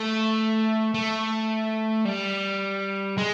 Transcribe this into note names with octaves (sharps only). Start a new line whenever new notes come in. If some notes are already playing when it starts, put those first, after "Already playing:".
Already playing: A3
A3
G3
G#3